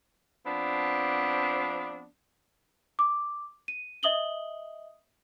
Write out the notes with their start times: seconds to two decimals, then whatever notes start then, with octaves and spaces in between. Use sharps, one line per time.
0.46 F3 B3 C4 D4
2.99 D6
3.68 D#7
4.03 D#5 E5 D#6 F#7 G7